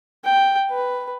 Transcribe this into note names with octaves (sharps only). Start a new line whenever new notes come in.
G5
B4